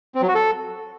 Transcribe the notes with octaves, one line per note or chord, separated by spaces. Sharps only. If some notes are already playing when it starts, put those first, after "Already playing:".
C4
F#3
F#4
A4